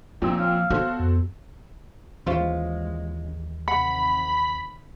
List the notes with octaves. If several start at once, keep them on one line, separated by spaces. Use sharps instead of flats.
A#2 F3 C4 D#4 E6
C#5 F5
B3 F#4 A4 C5
F2
D#2 E3 G#3 C#4 F4 C5
C3 D#3 F#5 B5